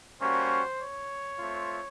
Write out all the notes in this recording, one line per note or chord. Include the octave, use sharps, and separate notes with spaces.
G3 A#3 C#4 F#4 C5
C#5
A3 C4 F4